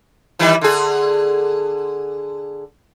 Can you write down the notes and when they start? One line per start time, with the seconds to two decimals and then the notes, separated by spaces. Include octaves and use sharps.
0.39 D#3 E3 G3
0.61 D3 G#4